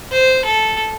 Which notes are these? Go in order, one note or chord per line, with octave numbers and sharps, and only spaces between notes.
C5
A4